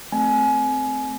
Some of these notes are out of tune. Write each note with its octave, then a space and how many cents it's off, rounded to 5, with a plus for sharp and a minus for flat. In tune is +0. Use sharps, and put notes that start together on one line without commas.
A3 +0 C4 +0 G#5 +25